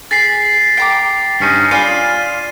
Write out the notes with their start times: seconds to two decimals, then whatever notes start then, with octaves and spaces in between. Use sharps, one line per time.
0.11 G#4 A6 B6 C7
0.77 G5 A#5 D6
1.40 G2 C#4 D#4
1.71 F4 D5 G#5 B5 D#7